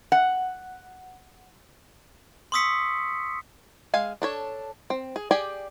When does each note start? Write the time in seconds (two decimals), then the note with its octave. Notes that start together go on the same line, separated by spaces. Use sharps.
0.12 F#5
2.52 C6 C#6 D#6 E6 B6 C#7
3.94 G#3 F5 G#5
4.22 D4 A4 C#5
4.90 C4
5.16 G#4
5.31 G4 G#4 D5 G5 G#5